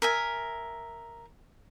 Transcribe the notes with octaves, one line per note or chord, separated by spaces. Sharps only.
A#4 E5 G#5